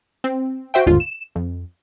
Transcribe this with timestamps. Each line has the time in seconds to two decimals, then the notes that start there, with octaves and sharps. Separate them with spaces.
0.24 C4
0.74 F#4 C5 E5 G5
0.86 G1 D#2 G#2 D3 F4
1.00 E7
1.35 F2